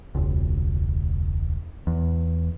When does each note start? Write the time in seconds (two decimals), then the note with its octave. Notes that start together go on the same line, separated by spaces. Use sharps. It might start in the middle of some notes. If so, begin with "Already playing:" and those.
0.15 E1 C#2
1.87 E2